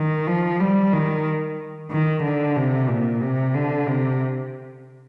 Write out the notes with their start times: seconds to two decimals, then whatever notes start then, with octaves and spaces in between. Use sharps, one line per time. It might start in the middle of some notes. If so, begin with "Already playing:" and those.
Already playing: D#3
0.27 F3
0.60 G3
0.93 D#3
1.91 D#3
2.23 D3
2.56 C3
2.89 A#2
3.21 C3
3.55 D3
3.87 C3